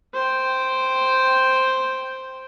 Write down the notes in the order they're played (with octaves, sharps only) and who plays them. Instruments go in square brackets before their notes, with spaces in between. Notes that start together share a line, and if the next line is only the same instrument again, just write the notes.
[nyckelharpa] C5 G5